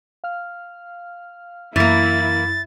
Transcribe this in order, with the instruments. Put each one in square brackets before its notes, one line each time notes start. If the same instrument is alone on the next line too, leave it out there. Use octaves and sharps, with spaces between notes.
[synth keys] F5 F6
[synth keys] F#2 [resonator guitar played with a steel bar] E3 A#3 [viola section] E4 [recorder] A6